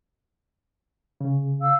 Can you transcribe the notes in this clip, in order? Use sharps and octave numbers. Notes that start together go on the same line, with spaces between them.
C#3
F5 E6